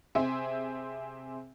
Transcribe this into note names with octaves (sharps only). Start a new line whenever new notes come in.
C3 C4 G#4 C5 E5 G#5